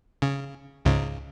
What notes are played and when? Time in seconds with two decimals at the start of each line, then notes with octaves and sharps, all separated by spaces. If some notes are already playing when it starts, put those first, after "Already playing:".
0.22 C#3
0.85 C#2 G#2 C#3